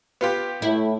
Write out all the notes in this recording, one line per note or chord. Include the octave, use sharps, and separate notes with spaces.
B3 F4 G4
A2 E4